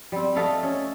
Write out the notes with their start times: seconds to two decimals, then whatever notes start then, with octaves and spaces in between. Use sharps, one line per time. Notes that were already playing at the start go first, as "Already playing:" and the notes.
0.12 G3 C4
0.36 A3 A4 D#5 F5
0.63 C#4 A4